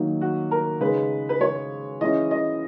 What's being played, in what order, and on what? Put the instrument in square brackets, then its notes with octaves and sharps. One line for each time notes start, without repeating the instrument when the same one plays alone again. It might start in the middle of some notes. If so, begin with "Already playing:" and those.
Already playing: [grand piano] D#3 F#3 A#3 D#4
[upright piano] F#4
A#4
[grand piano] C#3 G#3 D#4 [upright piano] B4
[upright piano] B4
C#5
[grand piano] E3 G#3 C#4 E4 [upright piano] D#5
[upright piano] D#5